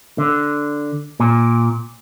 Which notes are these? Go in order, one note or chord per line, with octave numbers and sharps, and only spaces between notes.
D3
A#2